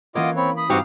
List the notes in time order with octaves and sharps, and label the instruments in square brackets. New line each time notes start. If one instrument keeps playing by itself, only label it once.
[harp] E3 C#4 [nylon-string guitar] A#3 [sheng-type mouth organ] F4 D#5 D6 [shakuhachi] F#5
[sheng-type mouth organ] C4 C#5 [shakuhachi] B5
[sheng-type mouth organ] B5 [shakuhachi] D#6
[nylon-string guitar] G2 D#4 G4 [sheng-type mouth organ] C4 F#4 C#6 [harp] F5